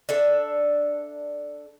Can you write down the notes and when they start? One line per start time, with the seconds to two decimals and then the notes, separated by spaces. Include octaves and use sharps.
0.09 D4 A4 E5